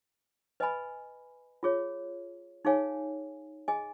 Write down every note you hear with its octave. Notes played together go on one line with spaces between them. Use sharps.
B4 D#5 G#5 B5
F4 G#4 C#5
D#4 G#4 C#5 F5 G#5
G#4 D#5 G#5